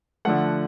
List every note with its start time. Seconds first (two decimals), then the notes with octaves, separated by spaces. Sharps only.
0.25 D3 F3 A3 F#5